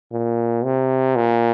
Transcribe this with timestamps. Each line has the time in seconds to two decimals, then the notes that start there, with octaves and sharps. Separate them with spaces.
0.12 A#2
0.64 C3
1.16 A#2